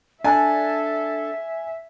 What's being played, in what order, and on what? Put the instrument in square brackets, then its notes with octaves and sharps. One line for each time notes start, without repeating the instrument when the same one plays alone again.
[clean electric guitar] D4 [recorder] A4 [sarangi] E5 [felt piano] G#5